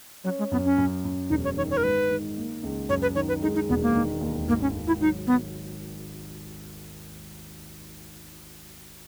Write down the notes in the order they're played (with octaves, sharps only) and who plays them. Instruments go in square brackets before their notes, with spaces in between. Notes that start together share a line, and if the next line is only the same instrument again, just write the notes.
[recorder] F#3 [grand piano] C#4
[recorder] G#3
[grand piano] F#2 [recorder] B3
[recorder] C#4
[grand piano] F#2
F#2
[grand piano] E1 [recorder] D#4
[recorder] C#5
[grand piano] D#3 [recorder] C#5
[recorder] C#5
A#4
[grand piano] G#2 [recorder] B4
[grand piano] D#3
A#3
C#2
[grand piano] F#2 [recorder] C#5
[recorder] B4
[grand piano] D#3 [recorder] C#5
[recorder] B4
[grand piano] G#3 [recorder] D#4
[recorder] D#4
[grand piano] E1 [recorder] B3
[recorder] A#3
[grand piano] D#3
D#2
[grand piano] G#1 [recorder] A#3
[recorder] C#4
[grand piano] G#1
[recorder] E4
[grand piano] F#3 [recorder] D#4
[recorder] B3